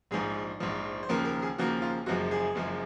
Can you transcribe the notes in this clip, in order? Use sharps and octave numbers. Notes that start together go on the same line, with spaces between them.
A#1 G#2 F3 G#4
A#1 G#2 F3
C5
D#2 C#3 F3 A#3 A#4
A#4
G#4
D#2 C#3 F3 A#3 F#4
F4
F#1 F#2 F3 G#3 F#4
G#4
F#1 F#2 F3 G#3